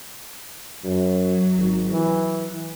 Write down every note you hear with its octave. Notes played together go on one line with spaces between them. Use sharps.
F#2 F#3
G#1
E3